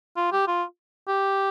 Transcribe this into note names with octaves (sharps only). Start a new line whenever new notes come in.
F4
G4
F4
G4